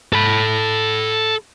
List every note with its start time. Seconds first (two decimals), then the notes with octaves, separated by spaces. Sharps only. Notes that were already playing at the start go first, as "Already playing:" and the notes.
0.13 A4 B5